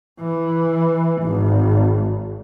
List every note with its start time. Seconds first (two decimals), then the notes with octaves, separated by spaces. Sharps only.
0.20 E3
1.23 G#1